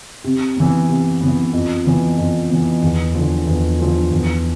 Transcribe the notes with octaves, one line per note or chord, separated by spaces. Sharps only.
C3
E3 B3
C3
E3 B3
F2
E3 B3
F2
E3 B3
E2
D3 F3
E2
D3 F3
E2